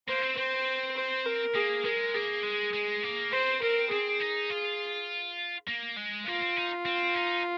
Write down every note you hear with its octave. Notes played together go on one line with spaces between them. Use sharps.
A#3 C5
C4
C4 C5
C5
A#4
A#3 G#4
G#3 A#4
A#3 G#4
G#3
G#3
A#3
C4 C5
C4 A#4
C4 G#4
D#4
F4
A#3
G#3
A#3 F4
C4
D#4
C4
D#4